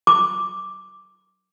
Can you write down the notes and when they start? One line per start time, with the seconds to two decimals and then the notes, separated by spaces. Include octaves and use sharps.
0.07 D6